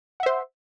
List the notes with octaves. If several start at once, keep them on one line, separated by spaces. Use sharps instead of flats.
C5 E5 F#5